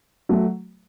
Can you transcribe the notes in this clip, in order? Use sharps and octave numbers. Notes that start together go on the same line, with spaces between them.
F#3 A3